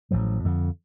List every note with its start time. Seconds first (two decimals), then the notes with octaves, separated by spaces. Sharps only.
0.11 A1 A2 F3 F#3
0.45 F2 D3